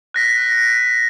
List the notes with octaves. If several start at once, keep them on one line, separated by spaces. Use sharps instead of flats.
F#6 A#6 B6